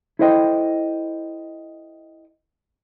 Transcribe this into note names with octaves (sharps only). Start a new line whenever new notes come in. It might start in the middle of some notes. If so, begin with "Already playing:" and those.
E4 A4 C5 D#5 G5